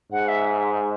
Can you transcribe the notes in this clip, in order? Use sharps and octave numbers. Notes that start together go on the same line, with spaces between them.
G#2 F#5
E5